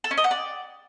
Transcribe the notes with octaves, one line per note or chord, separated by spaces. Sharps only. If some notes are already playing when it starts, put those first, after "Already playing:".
A4
C#4
D#5
F#5
D5